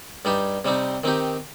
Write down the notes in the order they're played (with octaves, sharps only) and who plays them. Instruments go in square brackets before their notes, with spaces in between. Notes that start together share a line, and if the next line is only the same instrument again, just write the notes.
[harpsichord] G2 G3 D#4 G4
C3 G3 C4 D#4
D#3 C4 D#4 G4